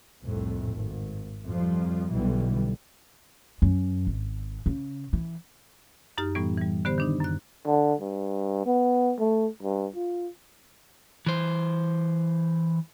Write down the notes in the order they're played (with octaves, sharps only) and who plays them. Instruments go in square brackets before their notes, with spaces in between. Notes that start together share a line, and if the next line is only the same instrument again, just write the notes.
[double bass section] C2 F2 A2
G#1
F2 F3 G3
B1 B2 D3 E3 G3
[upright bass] F#2
G#1
C#3
E3
[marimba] F#2 D#4 G4 A#5 F6
A2 E3 G3 B3
E3 G3
D3 B3 G4 C5
D#3 D4 D#4
F#2 F#6
[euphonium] D3
G2
B3
A3
G2
F4
[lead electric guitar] E3 C5